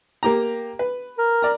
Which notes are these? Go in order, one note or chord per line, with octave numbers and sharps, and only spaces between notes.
A#3 G4 A#5
B4
A#4
D5 A#5